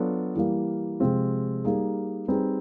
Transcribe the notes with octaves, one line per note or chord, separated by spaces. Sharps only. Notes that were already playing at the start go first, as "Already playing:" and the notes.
Already playing: F#3 B3 D4 F4 A4
E3 G3 A#3
C3 F3 G#3 C4 F4
G3 A#3 D#4 G#4
G3 C4 D#4 G#4 B4